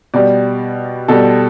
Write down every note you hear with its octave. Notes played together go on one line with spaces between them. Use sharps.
B2 G3 D5
B2 G3 A4